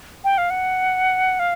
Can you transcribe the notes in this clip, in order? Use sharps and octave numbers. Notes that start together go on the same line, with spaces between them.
G5
F5
F#5
F5